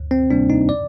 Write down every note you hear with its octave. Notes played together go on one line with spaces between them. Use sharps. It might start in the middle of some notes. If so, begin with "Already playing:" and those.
Already playing: D2
C4
C3 G3 A#3 D4
D#4
D5